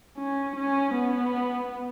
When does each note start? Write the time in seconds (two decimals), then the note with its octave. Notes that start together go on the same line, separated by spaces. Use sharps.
0.18 C#4
0.56 C#4
0.95 B3